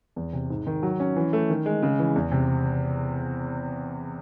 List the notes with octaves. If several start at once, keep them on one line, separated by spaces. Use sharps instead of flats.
E2
C3
G#2
D#3
F#3
C#4
E3
A3
D#3
G#3
C#3
E3
E2
C3